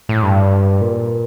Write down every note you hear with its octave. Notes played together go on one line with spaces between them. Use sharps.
A2
G2
A#2